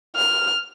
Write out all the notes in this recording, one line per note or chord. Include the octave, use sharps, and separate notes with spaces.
F6